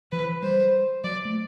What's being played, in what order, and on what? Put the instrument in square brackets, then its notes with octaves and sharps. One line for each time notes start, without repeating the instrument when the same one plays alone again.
[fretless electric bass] E3 [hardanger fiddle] B4
[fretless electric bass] G3 [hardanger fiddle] C5
[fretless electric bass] F#3 [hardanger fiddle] D5
[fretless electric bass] A3